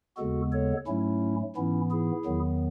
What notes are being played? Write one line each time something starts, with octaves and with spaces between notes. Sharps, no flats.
D#2 C#3 G#3 B3 F#4 A4
A4 C#5
G#2 F#3 A3 C#4 E4
G#2 E3 B3 C#4 E4
E4 G#4
E2 D#3 F#3 B3